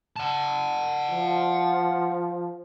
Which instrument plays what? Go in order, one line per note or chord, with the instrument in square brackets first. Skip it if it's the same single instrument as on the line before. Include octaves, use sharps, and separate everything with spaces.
[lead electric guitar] F#5 A5
[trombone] F3